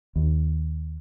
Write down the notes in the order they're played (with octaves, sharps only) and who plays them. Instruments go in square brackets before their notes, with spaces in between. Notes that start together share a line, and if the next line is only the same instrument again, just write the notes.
[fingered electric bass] D#2